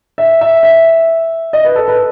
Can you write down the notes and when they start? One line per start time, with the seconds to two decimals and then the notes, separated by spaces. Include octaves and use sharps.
0.18 E5
0.41 E5
0.63 E5
1.53 D#5
1.65 B4
1.76 A4
1.88 B4